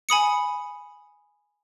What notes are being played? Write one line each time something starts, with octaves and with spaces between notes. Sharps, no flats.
G#5 B5 D#6 C#7